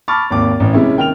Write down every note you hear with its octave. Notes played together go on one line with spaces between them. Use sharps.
A5 B5 C#6 D6 F6 A6
G#1 D#2 D6
A1
C3 G#3 C#4 E4
D#3 G5 F6 F7